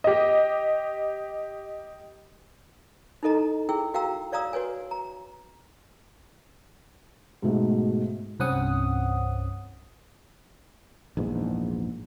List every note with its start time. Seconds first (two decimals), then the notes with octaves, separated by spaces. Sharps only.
0.04 G4 D#5
3.23 D#4 E4 A4 D#5 A#5
3.69 E4 G#4 G5 E6
3.94 F#4 F5 G5 A#5 E6
4.32 C#5 D5 F5 A#5 D#6 E6
4.53 F#4 B4 C#5 G#5
4.91 A#5
7.42 G#2 B2 A3
8.40 C2 G2 C4 C#4 F#5 D#6
11.17 A#1 E2 G#2